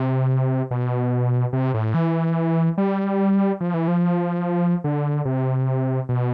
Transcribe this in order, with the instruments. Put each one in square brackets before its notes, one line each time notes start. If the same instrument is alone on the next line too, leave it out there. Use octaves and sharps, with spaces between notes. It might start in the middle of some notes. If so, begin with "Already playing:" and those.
Already playing: [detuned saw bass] C3
B2
C3
A2
E3
G3
F3
E3
F3
D3
C3
B2